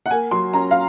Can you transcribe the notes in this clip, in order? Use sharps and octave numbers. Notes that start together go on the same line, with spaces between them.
F#5
A#3 G#5
F#3 C6
C#4 A#5
F5